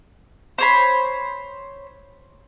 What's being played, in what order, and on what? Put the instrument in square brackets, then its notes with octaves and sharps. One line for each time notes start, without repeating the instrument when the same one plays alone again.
[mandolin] C5 C#5 B5